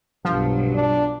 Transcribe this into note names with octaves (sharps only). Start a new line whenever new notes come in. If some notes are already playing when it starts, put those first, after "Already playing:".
B1 G2 F3 F#3
D4